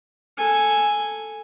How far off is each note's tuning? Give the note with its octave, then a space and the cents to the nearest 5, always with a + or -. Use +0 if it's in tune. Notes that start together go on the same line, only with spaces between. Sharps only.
A4 +0 G#5 +0